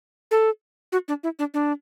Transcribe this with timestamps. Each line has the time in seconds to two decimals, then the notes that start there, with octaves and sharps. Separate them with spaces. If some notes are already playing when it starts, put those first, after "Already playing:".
0.31 A4
0.92 F#4
1.08 D4
1.23 E4
1.39 D4
1.54 D4